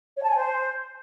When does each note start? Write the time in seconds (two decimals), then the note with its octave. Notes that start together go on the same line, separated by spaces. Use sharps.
0.17 C#5
0.23 A5
0.29 G#5
0.35 C5